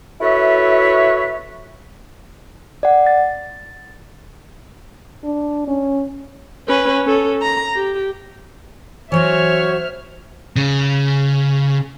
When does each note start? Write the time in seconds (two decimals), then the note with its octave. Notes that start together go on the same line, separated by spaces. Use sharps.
0.21 E4 F#4 A4 B4 C#5 E5
2.83 D5 F#5
3.07 A6
5.24 D4
5.68 C#4
6.68 C#4 B4
7.06 C#4 A4
7.42 A#5
7.75 G4
9.12 E3 F#3 F#4 C5 C#5 E5 F6
10.56 C#3